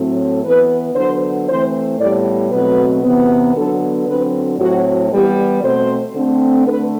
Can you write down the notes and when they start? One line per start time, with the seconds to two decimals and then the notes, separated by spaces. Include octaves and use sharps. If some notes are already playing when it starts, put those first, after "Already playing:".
Already playing: A2 F#3 A3 C4
0.44 E3 B3 B4
0.95 D3 F#3 B3 C5
1.48 E3 A3 C4 C5
1.99 A2 G3 B3 D5
2.51 B2 F#3 A3 C4 B4
3.04 C3 E3 B3
3.55 D3 F#3 B3 A4
4.07 D3 F#3 C4 B4
4.58 A2 F#3 C4 F#4
5.11 E3 G3 B3 G4
5.62 B2 A3 C4 C5
6.15 D3 A3 C4
6.66 D3 A3 B4